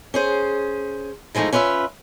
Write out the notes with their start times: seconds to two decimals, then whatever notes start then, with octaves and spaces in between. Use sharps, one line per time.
0.14 C#4 G#4 C5
1.35 E3 F3 G#3 A3 D#4
1.53 C#4 F4 B4 D#5 E5